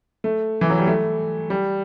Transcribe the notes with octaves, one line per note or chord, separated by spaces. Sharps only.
A3
E3
F#3
G3
A3
G3